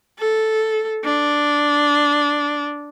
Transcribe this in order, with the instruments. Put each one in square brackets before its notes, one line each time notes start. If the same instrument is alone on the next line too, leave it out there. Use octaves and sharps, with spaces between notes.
[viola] A4
D4